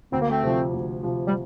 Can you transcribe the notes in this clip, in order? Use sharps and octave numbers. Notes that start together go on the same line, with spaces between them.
D2 C4
A#3
A3 C4
C3 F3
D2
C3 F3
G3